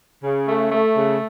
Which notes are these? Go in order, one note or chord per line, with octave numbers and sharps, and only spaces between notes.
C#3
A3
A3
C#3